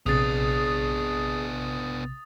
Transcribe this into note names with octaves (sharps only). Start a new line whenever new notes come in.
A#1 C3 B3 D4 G#4 D#6 A6